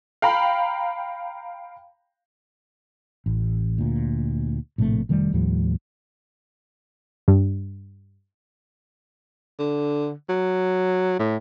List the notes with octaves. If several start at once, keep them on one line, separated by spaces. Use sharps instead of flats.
F5 G5 A#5 B5
A1
D2 A#2
A#1 A2 C3 A3
F1 D#3 G3 A3
D#2 A2 F3 G3
G2
D3
F#3
A2